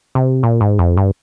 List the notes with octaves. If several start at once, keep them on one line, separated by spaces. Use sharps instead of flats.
C3
A#2
G#2
F2
G2